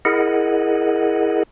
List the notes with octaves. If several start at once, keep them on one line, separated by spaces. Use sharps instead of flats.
E4 G#4 A#4 D#5 F#5